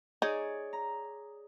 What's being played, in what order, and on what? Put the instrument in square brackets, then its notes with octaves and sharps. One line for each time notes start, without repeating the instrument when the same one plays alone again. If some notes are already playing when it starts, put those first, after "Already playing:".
[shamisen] D#4 [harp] G#4 C#5 D5
[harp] A#5